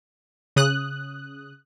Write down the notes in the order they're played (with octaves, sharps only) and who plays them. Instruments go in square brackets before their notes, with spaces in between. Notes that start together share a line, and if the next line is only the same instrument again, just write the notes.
[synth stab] C#3 D#6 F#6